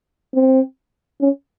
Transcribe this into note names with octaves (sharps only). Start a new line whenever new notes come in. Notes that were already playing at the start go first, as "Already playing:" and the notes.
C4
C#4